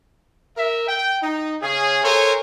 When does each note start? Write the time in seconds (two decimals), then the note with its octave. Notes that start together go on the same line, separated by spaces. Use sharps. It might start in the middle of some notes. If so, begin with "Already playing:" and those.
0.57 A#4 E5
0.88 G5
1.22 D#4
1.62 C#3 C#4 G#4
2.04 A4 A#4 C5 C#5 G#5